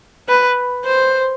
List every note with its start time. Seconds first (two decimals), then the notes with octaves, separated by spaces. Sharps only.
0.29 B4
0.85 C5